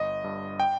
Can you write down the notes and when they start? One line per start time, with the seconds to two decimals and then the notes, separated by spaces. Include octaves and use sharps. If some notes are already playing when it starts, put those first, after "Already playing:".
Already playing: G1 D#5
0.24 G2
0.60 G5